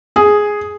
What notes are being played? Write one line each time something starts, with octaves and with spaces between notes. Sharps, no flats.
G#4